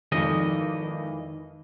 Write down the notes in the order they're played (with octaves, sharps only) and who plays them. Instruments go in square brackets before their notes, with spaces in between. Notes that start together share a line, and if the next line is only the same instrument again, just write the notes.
[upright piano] G#1 F2 [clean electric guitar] D#3 E3 D#5